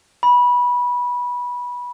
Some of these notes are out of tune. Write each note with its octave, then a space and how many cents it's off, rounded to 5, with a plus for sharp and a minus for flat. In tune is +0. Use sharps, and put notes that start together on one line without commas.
B5 -20